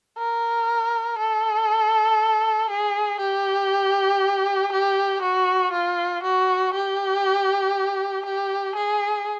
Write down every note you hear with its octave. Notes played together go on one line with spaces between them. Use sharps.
A#4
A4
G#4
G4
G4
F#4
F4
F#4
G4
G4
G#4